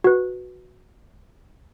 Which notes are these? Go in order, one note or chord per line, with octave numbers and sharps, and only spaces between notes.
F#4 B4